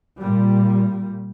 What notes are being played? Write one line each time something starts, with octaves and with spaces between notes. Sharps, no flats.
A#2 G3